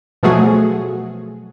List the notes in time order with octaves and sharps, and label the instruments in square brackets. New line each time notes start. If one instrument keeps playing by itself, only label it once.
[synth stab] B2 F3 F#3 A3 F#4 G#4